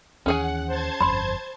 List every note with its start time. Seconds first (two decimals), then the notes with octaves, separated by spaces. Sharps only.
0.26 D#2 E3 C#4 G#4 F#5 G#5
0.67 C5 A5 G#6
1.01 G1 F2 B5 C6